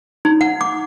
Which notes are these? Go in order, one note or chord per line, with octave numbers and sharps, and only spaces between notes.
D#4
F#5
D6